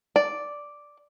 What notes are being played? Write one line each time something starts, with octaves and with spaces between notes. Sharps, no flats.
D5